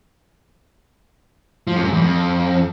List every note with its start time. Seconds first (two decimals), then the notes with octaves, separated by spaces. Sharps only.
1.67 F3
1.76 F2
1.84 F#2
1.93 E2
2.01 F2